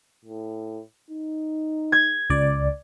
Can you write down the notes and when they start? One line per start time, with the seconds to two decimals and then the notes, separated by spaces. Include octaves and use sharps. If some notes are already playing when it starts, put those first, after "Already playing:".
0.25 A2
1.11 D#4
1.92 G#6
2.30 C#2 D5